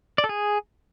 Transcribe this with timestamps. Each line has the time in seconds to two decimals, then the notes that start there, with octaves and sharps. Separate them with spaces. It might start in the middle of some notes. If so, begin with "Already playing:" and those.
0.18 D5
0.24 A4
0.29 G#4